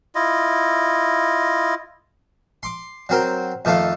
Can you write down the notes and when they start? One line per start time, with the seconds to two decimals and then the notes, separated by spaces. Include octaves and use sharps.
0.15 E4 F4 D#5
2.63 C6 D6
3.09 F#3 C4 A#4 G5
3.65 F2 D#3 A3 A4 F5